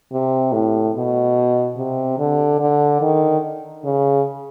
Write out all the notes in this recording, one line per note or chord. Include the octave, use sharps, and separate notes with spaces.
C3
A2
B2
C3
D3
D3
D#3
C#3